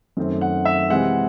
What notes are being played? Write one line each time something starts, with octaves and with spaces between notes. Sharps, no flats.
F#2 D#3 A3 C4
F#5
E5
C3 E3 G#3 C4 F#5